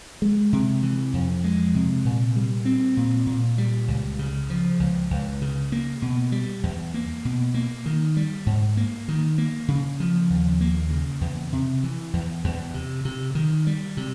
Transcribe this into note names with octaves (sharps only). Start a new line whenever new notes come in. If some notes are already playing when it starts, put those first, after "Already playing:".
G#3
C3
E3
F2
G#3
C3
A#2
G3
C4
A#2
A#2
G3
C#2
C#3
F3
C#2
C#2
C#3
A#3
B2
G3
E2
A#3
B2
A#3
D#3
G3
G#2
A#3
D#3
A#3
C#3
F3
D#2
A#3
C#3
E2
C3
E3
E2
E2
C3
C3
D#3
G3
C3